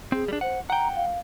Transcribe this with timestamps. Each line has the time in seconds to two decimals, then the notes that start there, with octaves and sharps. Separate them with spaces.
0.12 C4 G#4
0.28 G3 D4
0.41 C5 F#5
0.70 F#5 G5 A#5
0.96 F5